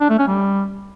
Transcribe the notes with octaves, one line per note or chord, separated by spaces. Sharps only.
D4
A3
C#4
G3